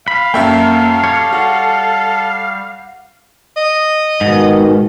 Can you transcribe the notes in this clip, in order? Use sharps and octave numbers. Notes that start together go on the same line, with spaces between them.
F5 B5
F#2 A#3 A4 E5 G5
G3 C#5
F#4
D#5
G#2 B2 D#3